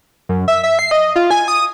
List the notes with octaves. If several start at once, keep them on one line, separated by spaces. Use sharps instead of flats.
F#2
E5
E5
C7
D#5
F4
G#5
D#6